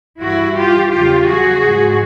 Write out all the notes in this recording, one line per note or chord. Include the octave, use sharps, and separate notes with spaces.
G2 E3 G3 E4 F#4
F4 G4
E2 C#3 F#3 F4 G4
F#4 G#4
G#2 F3